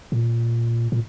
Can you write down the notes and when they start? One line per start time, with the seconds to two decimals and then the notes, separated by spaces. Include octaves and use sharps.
0.12 A#2
0.92 A#2